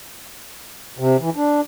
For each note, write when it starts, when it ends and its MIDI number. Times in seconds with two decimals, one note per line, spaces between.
0.99 1.17 48
1.20 1.30 52
1.36 1.61 62